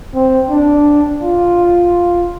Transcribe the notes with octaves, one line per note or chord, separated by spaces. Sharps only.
C4
D4
F4